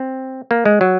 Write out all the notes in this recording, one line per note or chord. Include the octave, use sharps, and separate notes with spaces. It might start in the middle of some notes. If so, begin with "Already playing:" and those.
Already playing: C4
A#3
G#3
F#3